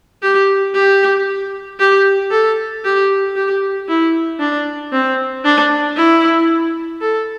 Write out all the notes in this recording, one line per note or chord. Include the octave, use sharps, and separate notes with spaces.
G4
G4
G4
A4
G4
G4
E4
D4
C4
D4
E4
A4